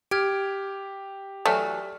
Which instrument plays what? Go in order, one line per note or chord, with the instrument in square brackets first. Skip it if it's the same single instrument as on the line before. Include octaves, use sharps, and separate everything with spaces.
[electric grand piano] G4 [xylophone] F6 G#6 D7
[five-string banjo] E3 F#3 F#4 [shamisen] A3 [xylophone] D5 F6